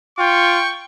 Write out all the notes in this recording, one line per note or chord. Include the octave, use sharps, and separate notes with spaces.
F4 G5 C#6